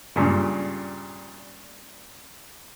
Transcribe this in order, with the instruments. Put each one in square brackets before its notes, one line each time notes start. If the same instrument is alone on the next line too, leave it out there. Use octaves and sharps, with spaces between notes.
[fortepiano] G2 A#2 C#3